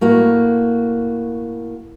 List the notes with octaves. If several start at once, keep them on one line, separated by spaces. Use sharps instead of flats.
A2 A#3 F#4